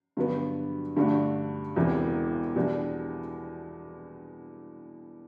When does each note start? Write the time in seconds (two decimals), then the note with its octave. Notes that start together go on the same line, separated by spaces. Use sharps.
0.17 G2 D3 F#3 B3
0.96 G2 D3 A3 D4 F#4
1.76 E1 E2 C3 E3
2.56 E2 B2 G3 D4